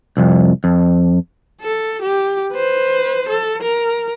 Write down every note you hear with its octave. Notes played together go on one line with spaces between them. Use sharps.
C2 F2
F2
A4
G4
B4 C5
A4
A#4